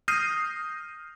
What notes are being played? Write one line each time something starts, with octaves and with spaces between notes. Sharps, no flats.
D#6 F6 G6 A#6 C7 D#7